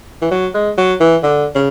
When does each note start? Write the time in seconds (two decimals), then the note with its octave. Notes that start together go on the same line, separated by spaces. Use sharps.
0.22 E3
0.31 F#3
0.54 G#3
0.78 F#3
1.00 E3
1.23 D3
1.55 C#3